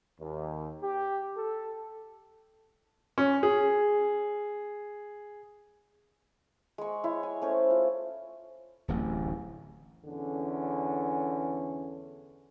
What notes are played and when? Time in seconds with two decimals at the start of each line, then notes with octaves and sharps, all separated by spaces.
0.20 D#2
0.82 G4
1.37 A4
3.18 C#4
3.43 G#4
6.78 G#3 C#6
7.04 E4 C#5
7.23 G#5
7.42 A3 C#4 C5
7.71 F4
8.88 D1 A1
10.06 E2 D3 C#4